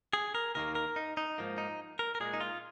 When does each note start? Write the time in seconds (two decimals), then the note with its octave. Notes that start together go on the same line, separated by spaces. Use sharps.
0.13 G#4
0.35 A#4
0.55 D#2 D#3 A#3 A#4
0.75 A#4
0.96 D#4
1.17 D#4
1.38 G#2 F3 A#3
1.58 D#4
1.99 A#4
2.15 A#4
2.20 A#2 G#3 G#4
2.33 D#4
2.40 F4